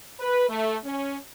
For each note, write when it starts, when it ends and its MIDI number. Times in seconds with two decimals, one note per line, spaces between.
0.20 0.47 71
0.49 0.77 57
0.84 1.17 61